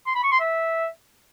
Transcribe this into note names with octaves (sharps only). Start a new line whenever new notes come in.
C6
B5
C#6
C6
E5